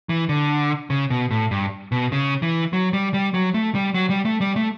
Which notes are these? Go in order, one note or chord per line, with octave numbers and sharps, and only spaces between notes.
E3
D3
C#3
B2
A2
G2
B2
C#3
E3
F#3
G3
G3
F#3
A3
G3
F#3
G3
A3
G3
A3